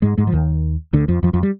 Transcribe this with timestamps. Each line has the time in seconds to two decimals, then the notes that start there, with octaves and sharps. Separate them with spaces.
0.02 G#2 G#3
0.18 G#2 G#3
0.27 F3
0.32 D#2 D#3
0.93 D2 D3
1.08 F2 F3
1.23 F2 F3
1.33 F2 F3
1.43 G3